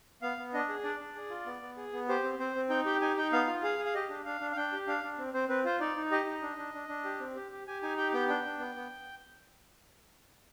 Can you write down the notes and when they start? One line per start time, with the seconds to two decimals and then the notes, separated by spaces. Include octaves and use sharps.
0.22 B3 F5
0.38 B3
0.54 D4 D#5
0.69 G#4
0.83 D4 D5
1.00 D4
1.15 G#4
1.30 F4
1.46 B3
1.62 B3
1.77 G#4
1.93 B3
2.08 G4 C5
2.23 C4
2.39 C4 C5
2.55 C4
2.70 D#4 G5
2.85 G4 G5
3.01 D#4 G#5
3.17 D#4 G5
3.32 B3 F5
3.47 F4
3.63 G#4 F5
3.79 G#4
3.85 F5
3.95 G4 D#5
4.09 D4
4.25 D4 F5
4.41 D4
4.52 F5
4.56 D4 G5
4.72 G4
4.87 D4 F5
5.04 D4
5.18 C4
5.34 C4 C5
5.49 C4 B4
5.64 F4 C5
5.80 D#4 D5
5.97 D#4
6.11 G4 D#5
6.26 D#4
6.42 D4
6.58 D4
6.74 D4
6.89 D4
7.05 G4
7.20 C4
7.35 G4
7.52 G4
7.67 G4 G#5
7.82 D#4 G#5
7.97 G4 G5
8.13 B3 G5
8.28 D4 G5
8.44 D4
8.59 B3
8.75 B3